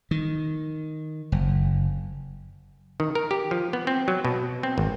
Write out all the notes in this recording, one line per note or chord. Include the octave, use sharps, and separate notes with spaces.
D#3
F#1
D#3
A#4
G4
F3
B3
C4
F#3
B2
C4
G#1